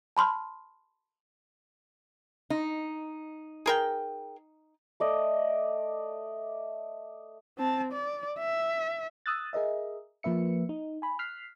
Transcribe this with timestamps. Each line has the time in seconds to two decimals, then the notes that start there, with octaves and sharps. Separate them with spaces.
0.17 A5 B5 C6 F6
2.50 D#4
3.66 G#4 A#4 G5
5.00 A3 D5 D#5
7.58 C4 A5
7.92 D5
8.39 E5
9.26 D#6 E6 F#6 A6
9.53 G#4 A#4 D#5 E5
10.23 F3 A#3 B4 E5 C#7
10.69 D#4
11.02 G#5 B5
11.19 F6 F#6 B6 C7